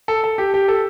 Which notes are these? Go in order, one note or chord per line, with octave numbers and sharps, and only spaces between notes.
A4
A4
G4
G4
A4